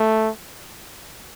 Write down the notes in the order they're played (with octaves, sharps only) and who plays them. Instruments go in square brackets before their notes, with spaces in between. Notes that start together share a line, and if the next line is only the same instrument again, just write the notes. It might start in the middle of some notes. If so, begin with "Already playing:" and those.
Already playing: [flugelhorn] A3